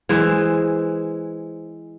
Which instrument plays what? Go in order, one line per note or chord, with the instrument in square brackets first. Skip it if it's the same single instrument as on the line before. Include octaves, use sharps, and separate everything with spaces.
[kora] E3 G#3 G#4 C5